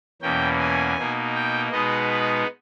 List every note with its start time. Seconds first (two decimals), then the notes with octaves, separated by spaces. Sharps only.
0.22 E2 B2 A#3 C#4 G5
0.59 G#5
0.97 B2 A#3 D#4
1.34 G5
1.72 B2 G#3 B3 D#4 D#5
2.10 B4